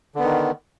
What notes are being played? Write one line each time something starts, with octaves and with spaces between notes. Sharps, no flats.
D3 D#3 B3